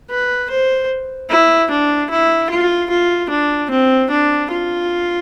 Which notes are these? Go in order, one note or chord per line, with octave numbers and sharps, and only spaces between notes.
B4
C5
E4
D4
E4
F4
F4
D4
C4
D4
F4